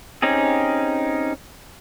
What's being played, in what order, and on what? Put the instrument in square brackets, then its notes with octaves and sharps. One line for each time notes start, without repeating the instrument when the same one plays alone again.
[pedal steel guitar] C4 C#4 D#4 G4 G#4